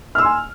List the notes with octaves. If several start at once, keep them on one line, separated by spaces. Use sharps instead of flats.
G#5 C6 E6 F6